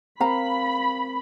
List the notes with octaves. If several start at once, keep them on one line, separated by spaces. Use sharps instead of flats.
C4 A#4 F5 A#5 B5